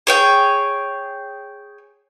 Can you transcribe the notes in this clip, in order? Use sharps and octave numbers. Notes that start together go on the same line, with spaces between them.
G#4 C#5 G5